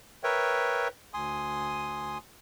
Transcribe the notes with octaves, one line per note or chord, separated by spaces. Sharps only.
A#4 B4 C#5 E5 G5
D2 G#5 C6 D#6